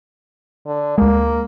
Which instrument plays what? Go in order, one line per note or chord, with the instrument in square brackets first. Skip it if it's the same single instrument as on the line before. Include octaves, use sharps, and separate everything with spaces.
[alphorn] D3
[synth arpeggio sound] D2 G#3 [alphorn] A#3